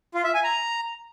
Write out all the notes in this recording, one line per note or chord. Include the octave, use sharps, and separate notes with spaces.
F4
E5
G#5
A#5